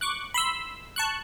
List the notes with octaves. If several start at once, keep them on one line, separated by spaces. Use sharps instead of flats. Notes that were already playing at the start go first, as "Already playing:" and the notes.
C#6 D6 F#6
B5 C6 E6
A5 C#6 F#6